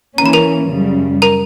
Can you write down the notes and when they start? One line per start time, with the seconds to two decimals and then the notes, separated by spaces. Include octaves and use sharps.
0.18 E3 A#3 C#4 A#5
0.26 B5
0.33 A#4 A#5
0.70 F#2 C#3 G3
1.22 A#4 A#5